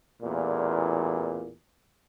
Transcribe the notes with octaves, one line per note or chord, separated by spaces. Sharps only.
A1 E2 A#2